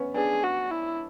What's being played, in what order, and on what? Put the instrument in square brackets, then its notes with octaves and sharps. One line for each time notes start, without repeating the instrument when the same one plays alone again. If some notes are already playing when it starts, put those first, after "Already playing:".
Already playing: [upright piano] B3 C#4
[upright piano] B3 D4 [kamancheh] G#4
[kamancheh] F#4
E4